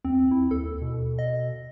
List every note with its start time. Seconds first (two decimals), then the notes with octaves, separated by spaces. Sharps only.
0.05 E2 C4
0.31 E4
0.51 D#2 A4
0.82 B2
1.19 D#5